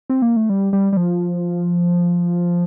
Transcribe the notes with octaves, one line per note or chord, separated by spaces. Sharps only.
C4
A#3
A3
G3
G3
G3
F3